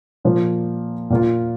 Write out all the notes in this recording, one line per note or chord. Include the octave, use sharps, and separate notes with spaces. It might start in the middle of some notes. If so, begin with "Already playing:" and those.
A#2 F3 A#3
A#2 A#3 F4